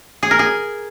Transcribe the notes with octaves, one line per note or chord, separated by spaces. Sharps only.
G#4
A#4
G#4